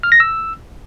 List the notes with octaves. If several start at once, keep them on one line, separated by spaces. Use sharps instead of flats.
F6
A#6
E6